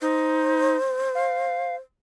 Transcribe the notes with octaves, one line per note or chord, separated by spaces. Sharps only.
D#4 C5
F5